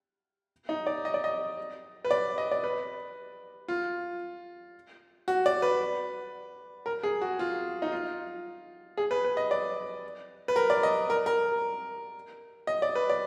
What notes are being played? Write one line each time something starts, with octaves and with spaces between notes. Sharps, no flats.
D#4
D5
D#5
D5
D#5
B4
D5
D#5
D5
B4
F4
F#4
D5
B4
A#4
G#4
F#4
F4
D#4
F4
G#4
B4
B4
D#5
D5
B4
A#4
D5
D#5
A#4
A#4
D#5
D5
B4
D5